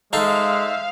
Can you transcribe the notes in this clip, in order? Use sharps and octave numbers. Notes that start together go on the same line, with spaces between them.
G#3 D#4 A4 C5 E5 F5